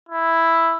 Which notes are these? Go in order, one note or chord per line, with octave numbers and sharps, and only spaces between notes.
E4